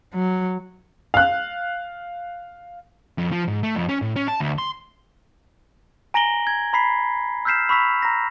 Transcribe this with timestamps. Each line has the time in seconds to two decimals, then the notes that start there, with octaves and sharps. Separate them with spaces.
0.13 F#3
1.14 F5 F#6
3.18 F2
3.32 F3
3.48 G#2
3.63 A3
3.75 F2
3.89 C#4
4.02 A2
4.16 C#4
4.28 A5
4.40 D2
4.58 C6
6.14 G#5 A#5 A#6 D7 F#7 G7
6.47 G#6
6.73 A#5 B5 B6 C7
7.45 E6 F6 G6 B6 C7 E7
7.69 B5 C#6 E6 B6 F7
8.02 A#5 A#6